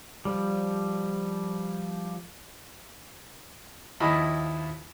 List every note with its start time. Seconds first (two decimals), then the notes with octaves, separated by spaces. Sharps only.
0.25 F3 G3
4.00 D#2 F3 E4 D#5 A5 B5